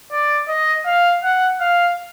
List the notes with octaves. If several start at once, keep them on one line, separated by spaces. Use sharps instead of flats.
D5
D#5
F5
F#5
F5